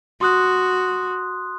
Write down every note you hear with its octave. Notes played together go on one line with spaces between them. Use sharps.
F#4 C6 D#6 F#6